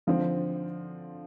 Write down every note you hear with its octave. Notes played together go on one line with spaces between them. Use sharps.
D3 F3 C4